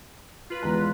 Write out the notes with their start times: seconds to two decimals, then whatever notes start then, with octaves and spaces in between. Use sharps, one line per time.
0.50 F4 B4
0.63 E2 G#3 A#5